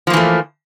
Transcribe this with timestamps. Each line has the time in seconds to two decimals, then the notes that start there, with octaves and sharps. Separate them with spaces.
0.07 F3
0.10 A#3
0.13 E3
0.17 A3